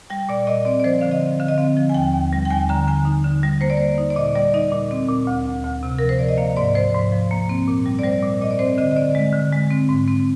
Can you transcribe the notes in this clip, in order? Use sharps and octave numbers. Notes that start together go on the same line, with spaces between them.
G3 G5
A#2 D5
A#2 D#5
C4 D5
D5
F3 C5
D3 F5
D#5
C4
D3 F5
D#5
C4 F5
F3
G#5
D#2 G5
D#2
G3
G5
D#2 G#5
D3 A#5
D3 G#5
D#4
D3
G3
A#3 C5
D5
A#3 C5
D#4
D5
A#2 D#5
G3 D5
D#4 D#5
A#2
C4
A#2
D2
D2
D2
C3
F3 A#4
C5
F3 D5
D#5
A#3 F5
G#2 D5
F3 C5
G#2
F3
A#3
C4
A#2
G3
D5
G3 C5
A#2
A#2 D#5
D5
C4 C5
D3 D#5
D#5
D3 D5
G#3
D3
G#3
C4
G#2
C4